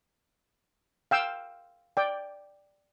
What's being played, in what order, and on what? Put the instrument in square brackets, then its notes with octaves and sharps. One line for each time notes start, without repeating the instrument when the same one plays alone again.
[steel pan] F5 G5 E6
D5 G5